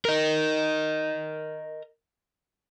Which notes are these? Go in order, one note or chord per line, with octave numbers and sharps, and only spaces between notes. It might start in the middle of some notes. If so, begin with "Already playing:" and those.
A#4 D#5